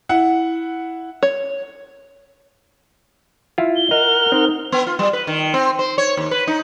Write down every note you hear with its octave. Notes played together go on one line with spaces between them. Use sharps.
E4 F#5
C#5
E4 F4
G7
A#4 D#5 F#5 F6
C4 D#4
B3
F4
G3
B4
D#3
C4
C5
C#5
D#2
B4
D#4